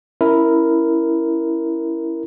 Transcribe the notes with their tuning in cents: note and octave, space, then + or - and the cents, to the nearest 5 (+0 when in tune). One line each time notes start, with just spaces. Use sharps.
C#4 +0 E4 +0 A#4 +0